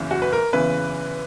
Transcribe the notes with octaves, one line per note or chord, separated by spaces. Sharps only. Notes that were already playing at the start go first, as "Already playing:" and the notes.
Already playing: F#1 E2 C#3 E3
F#4
B4
A#4
F#1 E2 C#3 E3 B4